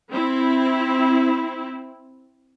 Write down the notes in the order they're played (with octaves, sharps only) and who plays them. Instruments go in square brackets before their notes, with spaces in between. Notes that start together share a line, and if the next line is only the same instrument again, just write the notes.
[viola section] C4 E4